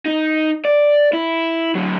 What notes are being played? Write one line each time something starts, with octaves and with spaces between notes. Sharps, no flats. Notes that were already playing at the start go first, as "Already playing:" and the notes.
D#4
D5
E4
D3 F#3